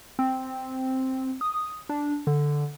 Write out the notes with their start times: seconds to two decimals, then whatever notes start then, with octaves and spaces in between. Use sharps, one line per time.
0.19 C4
1.41 D#6
1.89 D4
2.27 D3